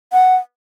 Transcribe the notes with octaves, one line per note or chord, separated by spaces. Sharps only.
F#5